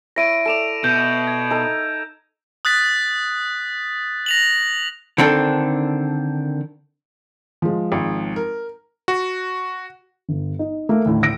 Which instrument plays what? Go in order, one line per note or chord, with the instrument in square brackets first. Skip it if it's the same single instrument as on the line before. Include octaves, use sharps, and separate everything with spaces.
[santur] E4 C#5 [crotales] A#6 D7 D#7
[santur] A4 D5 [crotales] D7 E7 F7
[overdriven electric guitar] B2 [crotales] G6
[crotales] G#6
[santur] D#4 A4 A#5
[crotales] D#6 F#6 A6 B6
A#6 F7 F#7
[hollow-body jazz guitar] D3 D#3 C4 D4 A4
[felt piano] F3 G#3
[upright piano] G#1
A#4
[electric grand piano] F#4
[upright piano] G1
D#4
[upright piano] A3 [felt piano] A#3 A#4
[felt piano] D#2 A2 D3
[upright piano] E6 A#6 D7